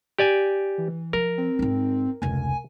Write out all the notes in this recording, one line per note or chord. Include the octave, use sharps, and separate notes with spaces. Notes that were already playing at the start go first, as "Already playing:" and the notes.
G4 D5 G#5
E3
F3 A#4
C4
G#1 D#4
F1 C#2 G#5